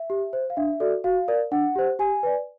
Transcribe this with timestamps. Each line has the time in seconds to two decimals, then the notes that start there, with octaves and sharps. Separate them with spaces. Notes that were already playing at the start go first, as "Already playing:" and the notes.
Already playing: E5
0.10 G4
0.33 C5
0.50 F5
0.57 D4 E5
0.80 F#4 A4 D5
1.04 F#4 F5
1.28 A#4 D5
1.52 D4 F#5
1.76 G4 C5
1.99 G4 G#5
2.23 B4 D5